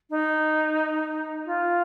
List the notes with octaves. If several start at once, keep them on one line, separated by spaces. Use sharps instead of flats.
D#4
F4